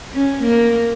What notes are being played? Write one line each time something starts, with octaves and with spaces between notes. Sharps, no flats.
C#4
A#3